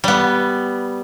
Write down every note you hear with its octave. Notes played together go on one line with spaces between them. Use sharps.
G3 B3